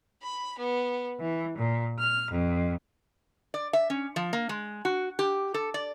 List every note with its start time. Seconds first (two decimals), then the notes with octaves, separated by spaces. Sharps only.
0.23 B5
0.58 B3
1.20 E3
1.57 A#2
2.00 F6
2.31 F2
3.54 D5
3.73 E5
3.90 C#4
4.16 F3
4.33 A#3
4.49 G#3
4.85 F#4
5.19 G4
5.54 A4
5.74 D5